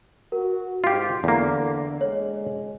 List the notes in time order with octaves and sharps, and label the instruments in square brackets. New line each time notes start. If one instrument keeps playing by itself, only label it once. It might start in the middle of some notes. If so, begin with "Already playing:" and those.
[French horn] F#4 [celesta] A#4
[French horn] G#2 [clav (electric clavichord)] F4 G4
[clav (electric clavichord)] E2 A#3 [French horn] D3
[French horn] G#3 [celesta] C#5